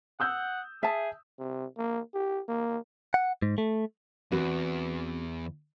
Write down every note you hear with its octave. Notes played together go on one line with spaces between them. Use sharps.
F#5 D#6 E6 G6
G#4 E5 A5
C3
A#3
G4
A#3
F#5
G#2
A3
E2 C4 F#4 B4